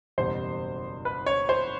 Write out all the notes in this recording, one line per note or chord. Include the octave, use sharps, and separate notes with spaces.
F#1 E2 B2 G3 C5
B4
C#5
C5